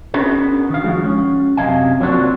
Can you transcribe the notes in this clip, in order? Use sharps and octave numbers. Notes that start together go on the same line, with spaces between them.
B3 C#4 D4 F#4 G#4 A#4
D#3 F5
F3 G#3 F#4
C#4
F#2 C3 G3 D#5 F5 G#5
F3 F#3 A#3 C4 D4 F#4